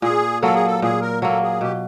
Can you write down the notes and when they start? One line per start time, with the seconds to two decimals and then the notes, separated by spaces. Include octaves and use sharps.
0.02 A#2 G#4
0.42 F#3 A#3 A4
0.55 G#4
0.66 A4
0.82 A#2 G#4
1.02 A#4
1.21 F#3 A#3 A4
1.42 G#4
1.61 B2 G4